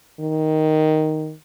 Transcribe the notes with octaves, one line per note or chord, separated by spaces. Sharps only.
D#3